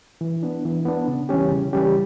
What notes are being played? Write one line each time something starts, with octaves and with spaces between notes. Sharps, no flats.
E3
B3 D4
E3
B3 D4
C#3
E3 G3 C#4 G4
C#3
E3 G3 C#4 G4